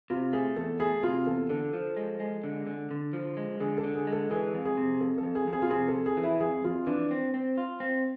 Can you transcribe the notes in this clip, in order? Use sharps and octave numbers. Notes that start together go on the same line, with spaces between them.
C3 F4
A3 G#4
E2 A4
A3 G#4
C3 F4
E2 A4
D3 A4
F3
G#3
G#3
D3
D3
D3
F3
G#3
D3 G#4
A4
D3
G#4
G#3
A4
E3 G#4
F2
G#4
C3
F2 A4
A4
F2
G#4
F2
G#4
F4
C3 G#4
A4
F2
G#4
E3
E4
F2 G#4
F2 F4
E3 D4
C4
C4
F4
C4